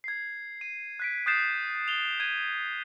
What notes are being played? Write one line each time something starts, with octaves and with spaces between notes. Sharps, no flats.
G#6 C7
D#7
F#6 B6 D7
D#6 F#6 G6 A6 C7 E7
F7 G7
G#6 D#7